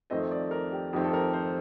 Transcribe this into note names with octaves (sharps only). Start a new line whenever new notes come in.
F2 D#3 A3 C4 D#5
D5
A#4
G4
F2 D#3 A3 C4 G4
A4
A#4
C5